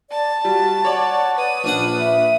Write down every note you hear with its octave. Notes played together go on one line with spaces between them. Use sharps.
D5 A5
G3 F#4
C#5 D5 F#5
B4 D#6
A#1 D4 F#5
E5